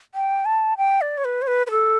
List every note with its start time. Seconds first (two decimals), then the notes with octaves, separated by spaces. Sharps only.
0.15 G5
0.45 A5
0.78 G5
1.01 D5
1.18 C#5
1.25 B4
1.42 C#5
1.47 B4
1.67 B4
1.71 A4